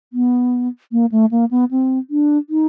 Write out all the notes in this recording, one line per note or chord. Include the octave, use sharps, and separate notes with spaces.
B3
A#3
A3
A#3
B3
C4
D4
D#4